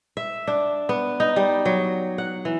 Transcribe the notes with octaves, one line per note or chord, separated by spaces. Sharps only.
E5
D4
B3
D#4
G3
F#3
F#5
E3